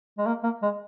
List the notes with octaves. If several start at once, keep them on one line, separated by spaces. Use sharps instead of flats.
G#3
A#3
A#3
G#3